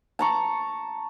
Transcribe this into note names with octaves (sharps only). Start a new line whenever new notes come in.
A5 A#5 C#6